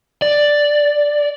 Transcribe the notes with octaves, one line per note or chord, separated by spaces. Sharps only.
D5